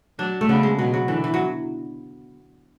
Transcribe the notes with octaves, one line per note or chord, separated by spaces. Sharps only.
F#3 D4
A3
C#3 B3
G#3
B2 F#3
F#3
D3 E3
E3
F#3